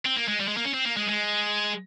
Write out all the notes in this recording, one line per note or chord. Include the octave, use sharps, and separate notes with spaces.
C4
A#3
G#3
G3
G#3
A#3
C#4
C4
A#3
G#3
G#3